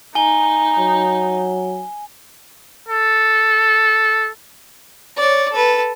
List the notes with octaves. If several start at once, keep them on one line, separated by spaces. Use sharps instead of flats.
D#4 G#5 G7
F#3
A4
C#5 D5
A4 B4